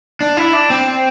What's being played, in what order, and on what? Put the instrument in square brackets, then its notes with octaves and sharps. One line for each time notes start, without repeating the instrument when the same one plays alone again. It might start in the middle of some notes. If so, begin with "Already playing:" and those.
[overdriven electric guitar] D4
E4
D4
C4